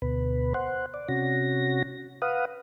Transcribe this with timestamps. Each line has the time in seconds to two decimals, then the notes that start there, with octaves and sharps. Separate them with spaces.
0.02 D2 B2 B4
0.54 C5 F#5
0.94 D5
1.08 C3 C#4 F#4 A#6
2.22 B4 F5 F#5 D#6